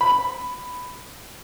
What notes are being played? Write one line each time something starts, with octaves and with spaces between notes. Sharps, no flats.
B5